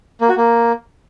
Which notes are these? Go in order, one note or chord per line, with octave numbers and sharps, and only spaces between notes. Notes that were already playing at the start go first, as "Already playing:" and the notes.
A#3
F#4
A#3